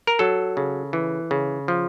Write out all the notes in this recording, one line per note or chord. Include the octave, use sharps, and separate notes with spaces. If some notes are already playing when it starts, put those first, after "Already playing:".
A#4
F#3 A4
C#3
E3
C#3
F3